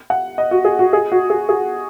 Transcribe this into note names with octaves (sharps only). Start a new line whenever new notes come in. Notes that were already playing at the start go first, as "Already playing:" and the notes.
F#5
D#5
F#4
G#4
F#4
G#4
F#4
G#4
G#4